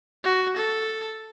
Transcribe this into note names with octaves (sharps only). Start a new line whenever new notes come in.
F#4
A4